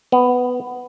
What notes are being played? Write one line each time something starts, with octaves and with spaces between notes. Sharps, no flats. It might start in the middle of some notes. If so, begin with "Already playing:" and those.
B3